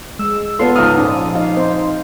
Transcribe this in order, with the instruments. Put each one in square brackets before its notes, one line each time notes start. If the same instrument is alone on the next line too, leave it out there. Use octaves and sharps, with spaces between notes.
[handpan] G#3 [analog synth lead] E6
[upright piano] B3 F4 [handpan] A4 [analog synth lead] C6
[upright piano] C#2 G#2 F6 [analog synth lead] D#6
[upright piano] A#1 [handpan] F3 C#4 D#4
[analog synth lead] D#4 [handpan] F5
[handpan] C4 C5